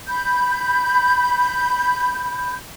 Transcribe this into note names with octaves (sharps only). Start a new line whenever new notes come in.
B5 G6